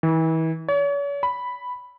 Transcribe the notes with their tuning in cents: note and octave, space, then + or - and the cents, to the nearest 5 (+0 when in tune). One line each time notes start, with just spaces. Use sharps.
E3 -35
C#5 +40
B5 +0